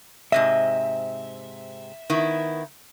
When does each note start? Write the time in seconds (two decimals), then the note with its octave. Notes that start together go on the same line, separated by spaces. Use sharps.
0.32 G#2 C3 D#5 E5
2.10 D#3 B3 E4